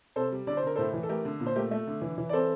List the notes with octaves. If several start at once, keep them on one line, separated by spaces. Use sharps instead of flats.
C3 A4 C5
G3
D3 D5
C5
D3 A#4
A2 A4 C5
E3
A4
A3 G4 A#4
D3
A#2
C5
A3 G4 A#4
A3
D3
E3
E3
D5
C4 A4 C5